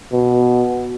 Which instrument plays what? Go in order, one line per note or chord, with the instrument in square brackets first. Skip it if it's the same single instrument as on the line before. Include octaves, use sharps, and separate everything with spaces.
[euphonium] B2